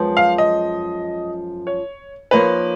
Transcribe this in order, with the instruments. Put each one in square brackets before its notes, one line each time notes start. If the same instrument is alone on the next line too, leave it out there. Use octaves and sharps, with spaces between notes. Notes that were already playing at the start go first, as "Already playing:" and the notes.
Already playing: [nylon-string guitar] F#2 F3 G#3 B3
[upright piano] F5
D#5
C#5
[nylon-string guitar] F3 A#3 D#4 A#4 C#5 [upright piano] B4